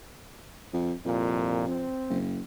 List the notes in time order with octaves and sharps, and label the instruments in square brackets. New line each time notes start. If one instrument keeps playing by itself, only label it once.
[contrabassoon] F2
[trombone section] C2 A#2 [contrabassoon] F2
[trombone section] C4
[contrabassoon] F#1